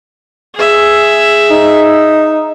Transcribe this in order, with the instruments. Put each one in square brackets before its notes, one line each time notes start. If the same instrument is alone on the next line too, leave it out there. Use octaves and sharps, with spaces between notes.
[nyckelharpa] G#4 E5
[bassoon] D#4